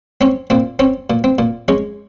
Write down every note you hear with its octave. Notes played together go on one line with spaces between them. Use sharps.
C4 C#4
A#2 C4
C4 C#4
A#2
C4
A#2
G#3 C#4